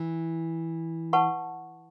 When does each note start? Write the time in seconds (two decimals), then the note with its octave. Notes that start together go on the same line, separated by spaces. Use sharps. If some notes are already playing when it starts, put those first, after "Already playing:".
Already playing: E3
1.13 B4 F#5 A5 C#6